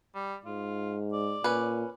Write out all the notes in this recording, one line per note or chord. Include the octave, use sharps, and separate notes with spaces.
G3
G#2 F4
D5
A#2 C#4 B4